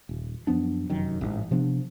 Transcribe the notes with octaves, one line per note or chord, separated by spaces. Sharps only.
D#1
F#2 F3 B3 D4
F1 F#2 D#3
A1 G#2
C3 F3 B3 D4